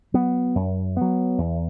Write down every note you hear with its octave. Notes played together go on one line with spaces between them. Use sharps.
F#3 B3
F#2
F#3 B3
E2